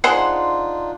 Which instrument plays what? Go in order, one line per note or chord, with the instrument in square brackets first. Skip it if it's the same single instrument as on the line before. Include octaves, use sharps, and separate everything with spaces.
[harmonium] D4 D#4 F4 [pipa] G#4 C5 F#5 [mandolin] C6